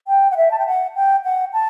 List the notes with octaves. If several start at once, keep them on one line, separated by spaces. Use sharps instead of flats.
G5
F#5
E5
A5
G5
F#5
G5
F#5
A5